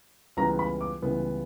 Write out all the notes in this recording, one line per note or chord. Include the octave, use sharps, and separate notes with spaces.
C#2 C#3 E3 G3 B3 A#5
B5
D6
C#2 C#3 E3 G3 B3